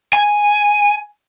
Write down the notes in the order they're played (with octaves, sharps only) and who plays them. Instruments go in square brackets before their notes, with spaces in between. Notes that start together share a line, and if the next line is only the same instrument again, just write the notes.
[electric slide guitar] G#5